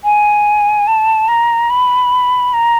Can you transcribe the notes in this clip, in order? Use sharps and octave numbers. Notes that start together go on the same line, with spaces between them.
G#5
A5
A#5
B5
A#5